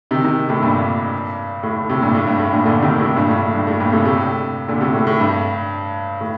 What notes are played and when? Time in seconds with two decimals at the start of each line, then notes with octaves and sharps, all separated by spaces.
0.11 C3 D#3
0.24 C3 D#3
0.49 A2 C3
0.62 G2 A#2
1.63 A2
1.76 A2
1.90 A2 C3
2.02 G2 A#2
2.14 A2
2.27 G2
2.39 A2
2.53 G2 A#2
2.65 A#2 D3
2.82 C3 D#3
2.99 A2 C3
3.16 G2 A#2
3.29 A2
3.42 A2
3.54 G2
3.67 A2
3.80 G2 A#2
3.92 A2 C3
4.05 A2 C3
4.68 A#2 D3
4.81 A2 C3
4.93 A2
5.07 A2
5.20 G2
6.21 A2